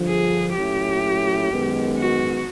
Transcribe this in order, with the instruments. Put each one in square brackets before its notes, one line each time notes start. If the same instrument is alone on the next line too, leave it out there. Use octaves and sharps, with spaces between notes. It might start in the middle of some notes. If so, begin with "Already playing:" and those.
Already playing: [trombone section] G2 D3 F3
[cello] G#4
[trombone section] A#2 F#3 A3 C#4 E4 [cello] G4
[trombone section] F#2 D#3 G#3 B3
[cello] F#4